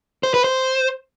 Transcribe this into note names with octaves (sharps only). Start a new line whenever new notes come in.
C5
B4
C5